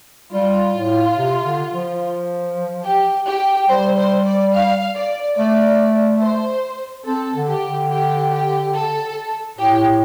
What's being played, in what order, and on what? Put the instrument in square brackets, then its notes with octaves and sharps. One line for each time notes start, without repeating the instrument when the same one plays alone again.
[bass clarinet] G3 [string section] F4
[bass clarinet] A2
C3
D3
F3
[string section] G4
G4
[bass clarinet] G3 [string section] C5
[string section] C5
D5
F5
D5
[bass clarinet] A3 [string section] D5
[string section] C5
[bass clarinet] C4 [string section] A4
[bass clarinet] D3
[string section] G4
[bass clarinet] D3
[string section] G4
G4
A4
[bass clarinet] A2 [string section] G4